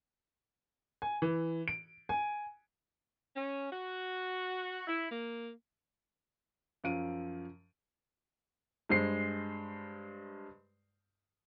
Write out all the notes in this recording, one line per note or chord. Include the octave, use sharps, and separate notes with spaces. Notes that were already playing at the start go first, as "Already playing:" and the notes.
G#5
E3
D7
G#5
C#4
F#4
E4
A#3
F#2 F3 F5 D7 D#7
G2 G#3 C5 C7